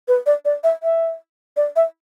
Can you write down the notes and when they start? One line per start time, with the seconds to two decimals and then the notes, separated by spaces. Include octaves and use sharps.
0.08 B4
0.26 D5
0.45 D5
0.64 E5
0.83 E5
1.57 D5
1.76 E5